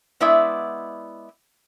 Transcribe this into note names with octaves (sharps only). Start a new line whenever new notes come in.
G#3 B3 E4 D5 E5